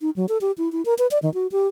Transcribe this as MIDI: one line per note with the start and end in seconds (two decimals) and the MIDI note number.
0.01 0.10 63
0.16 0.26 54
0.29 0.38 69
0.41 0.52 67
0.58 0.71 64
0.72 0.84 64
0.85 0.94 70
0.98 1.07 71
1.11 1.18 74
1.22 1.33 51
1.34 1.47 66
1.52 1.67 67